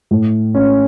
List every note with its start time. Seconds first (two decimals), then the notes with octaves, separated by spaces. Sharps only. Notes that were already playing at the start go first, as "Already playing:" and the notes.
0.11 A2
0.55 C#4